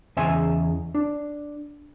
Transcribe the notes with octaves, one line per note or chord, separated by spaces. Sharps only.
E2 C#3 D#5 E5 G#5 C6
D4